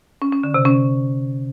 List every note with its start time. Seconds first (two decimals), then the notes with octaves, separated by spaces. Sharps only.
0.22 C#4
0.33 C#4
0.44 D3
0.54 C3
0.65 C#4